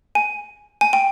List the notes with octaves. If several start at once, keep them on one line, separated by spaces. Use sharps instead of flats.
G#5
G#5
G5